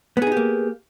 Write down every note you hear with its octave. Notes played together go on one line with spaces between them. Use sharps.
A#3 B3 D#4 G4 G#4